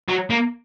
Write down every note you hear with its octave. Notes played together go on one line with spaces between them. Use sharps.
F#3
A#3